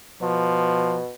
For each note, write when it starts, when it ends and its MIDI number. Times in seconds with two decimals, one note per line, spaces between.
0.21 1.13 47
0.21 0.99 53